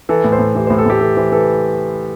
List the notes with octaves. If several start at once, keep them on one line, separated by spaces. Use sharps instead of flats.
E3 A4
A2
C5
A2
E3 G4
A2 C5
A4
A2 G4
E3 A4
E3 C5
E3 A4